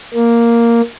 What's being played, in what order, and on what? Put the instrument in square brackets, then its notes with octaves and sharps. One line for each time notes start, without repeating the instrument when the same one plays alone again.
[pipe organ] A#3